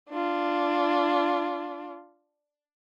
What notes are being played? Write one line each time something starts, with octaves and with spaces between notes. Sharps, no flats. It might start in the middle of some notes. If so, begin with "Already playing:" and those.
D4 F4